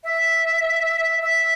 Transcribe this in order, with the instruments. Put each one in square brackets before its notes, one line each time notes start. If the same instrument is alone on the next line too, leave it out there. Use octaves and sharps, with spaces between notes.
[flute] E5
E5